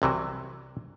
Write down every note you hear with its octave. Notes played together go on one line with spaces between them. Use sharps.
C2 C3 E3 F#3